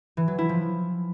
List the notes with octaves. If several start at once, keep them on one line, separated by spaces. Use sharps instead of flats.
E3
F#3
E4
F3